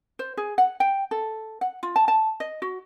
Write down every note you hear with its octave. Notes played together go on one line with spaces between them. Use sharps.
C5
G#4
F#5
G5
A4
F#5
F4
A5
A5
D#5
F#4